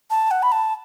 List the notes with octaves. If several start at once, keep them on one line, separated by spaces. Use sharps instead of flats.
A5
F#5
B5
A5